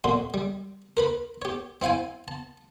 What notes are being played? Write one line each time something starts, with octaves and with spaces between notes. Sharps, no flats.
F2 A#2 F#4 C6
G3
A#4 B4 B5
G4 C#5
C4 E4 F5 G5 G#5
A5